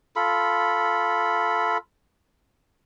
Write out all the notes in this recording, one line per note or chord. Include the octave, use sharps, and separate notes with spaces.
F4 A4 B5